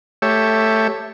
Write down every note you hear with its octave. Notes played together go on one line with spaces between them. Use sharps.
A3 G4 C#5 E5